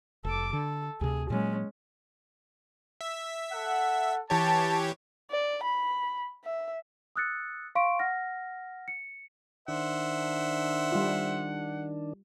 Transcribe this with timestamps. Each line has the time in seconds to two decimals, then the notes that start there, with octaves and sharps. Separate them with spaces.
0.25 F1 A4 D6
0.53 D3 A4
1.01 D2 C3 G#4
1.30 A#2 F#3 G#3 C#4
3.01 E5
3.52 A4 F#5
4.30 E3 G4 C#5 A5
5.31 D5
5.65 B5
6.44 E5
7.16 D#6 E6 F#6 A6 C#7
7.75 F5 C6 C#6 D7
7.99 F#5 F6 A#6
8.88 C#7
9.68 D#3 D4 C5 E5 F#5
10.92 G3 F4